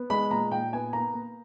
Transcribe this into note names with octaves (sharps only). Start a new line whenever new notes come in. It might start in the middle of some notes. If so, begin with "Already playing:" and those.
Already playing: B3
G#3 B5
A#2 A#5
A#2 G5
B3 G#5
A#3 A#5
A#3